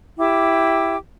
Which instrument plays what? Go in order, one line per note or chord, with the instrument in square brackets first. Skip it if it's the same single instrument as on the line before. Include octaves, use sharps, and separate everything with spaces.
[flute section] E4 G4 G5 D6